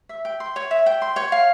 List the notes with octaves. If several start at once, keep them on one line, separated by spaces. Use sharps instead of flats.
E5
G5
C6
C#5
E5
G5
C6
C#5
F5